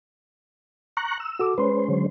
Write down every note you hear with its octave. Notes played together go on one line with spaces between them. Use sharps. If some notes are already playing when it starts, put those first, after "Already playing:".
A#5 C#6 F#6
E6
F#4 A4 D6
G#3 C#4 B4 C5 C6
D3 F#3